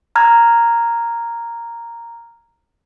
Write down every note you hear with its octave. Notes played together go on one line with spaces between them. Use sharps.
A#5 F6 G#6